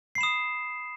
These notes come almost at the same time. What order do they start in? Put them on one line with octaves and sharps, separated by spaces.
C7 B5 E7 D#6